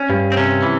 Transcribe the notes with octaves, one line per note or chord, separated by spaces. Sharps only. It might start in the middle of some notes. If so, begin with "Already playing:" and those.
Already playing: C#4
G2
C4
C3 C#4
E3